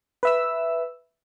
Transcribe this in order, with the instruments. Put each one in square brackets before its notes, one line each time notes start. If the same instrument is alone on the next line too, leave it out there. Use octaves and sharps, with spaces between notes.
[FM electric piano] B4 E5 E6